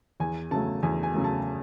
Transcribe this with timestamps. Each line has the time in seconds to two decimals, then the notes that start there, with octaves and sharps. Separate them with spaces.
0.20 E2 G#5
0.51 C#3 F#3 A3 A5
0.83 E2 G#5
1.03 G#5
1.14 C#3 F#3 A3
1.24 A5